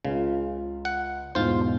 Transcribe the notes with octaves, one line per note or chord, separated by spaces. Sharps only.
C#2 C#3 F4
F#5
E2 G#2 B2 F4 C5